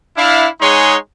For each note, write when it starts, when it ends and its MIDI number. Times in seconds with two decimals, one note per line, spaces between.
0.17 0.47 62
0.17 0.47 64
0.17 0.47 77
0.61 0.96 56
0.61 0.96 63
0.61 0.96 68
0.61 0.96 73
0.61 0.96 78
0.61 0.96 84